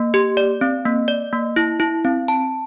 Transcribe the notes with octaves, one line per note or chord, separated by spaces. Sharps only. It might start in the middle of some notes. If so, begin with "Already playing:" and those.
Already playing: A#3
G4
D5
C4
A#3
D5
A#3
E4
E4
C4
A5